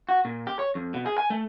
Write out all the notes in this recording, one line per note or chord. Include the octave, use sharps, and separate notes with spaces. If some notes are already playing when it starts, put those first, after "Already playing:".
F#4
A#2
G4
C#5
F2
B2
G#4
G#5
A3